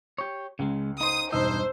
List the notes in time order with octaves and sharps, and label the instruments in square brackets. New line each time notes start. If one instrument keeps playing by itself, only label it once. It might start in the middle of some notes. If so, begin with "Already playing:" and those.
[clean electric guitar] G4 C#5
[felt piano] C#2 [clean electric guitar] C#3 G#3
[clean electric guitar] D#4 C5 [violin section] D#6
[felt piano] E1 D#4 E6 [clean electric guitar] G2 D#5 [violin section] C5